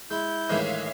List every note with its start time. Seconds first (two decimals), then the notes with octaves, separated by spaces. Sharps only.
0.11 G#3 E4 G6
0.49 A2 D#3 E3 G#3 D4 C#5 E5 F5